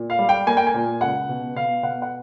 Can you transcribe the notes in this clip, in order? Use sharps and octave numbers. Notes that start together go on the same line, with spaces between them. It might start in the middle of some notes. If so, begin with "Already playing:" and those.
Already playing: A#2
F5
G3
G5
A#3 G#5
G5
G#5
A#2
C#2 F#5
B2
B2 F5
B2 F#5
F#5